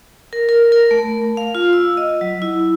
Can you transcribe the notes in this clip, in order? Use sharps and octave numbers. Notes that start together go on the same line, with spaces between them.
A#4
A#4
A#4
A3
F5
F4
E6
D#5
F#3
E4